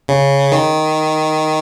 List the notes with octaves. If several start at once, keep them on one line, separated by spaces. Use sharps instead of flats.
C#3
D#3